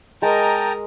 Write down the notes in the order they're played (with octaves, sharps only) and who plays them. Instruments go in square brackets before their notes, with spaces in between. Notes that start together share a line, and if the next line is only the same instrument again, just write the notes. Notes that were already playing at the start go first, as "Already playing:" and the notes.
[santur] G#3 [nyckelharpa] A#4 D#5 [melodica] G5 A5 A#5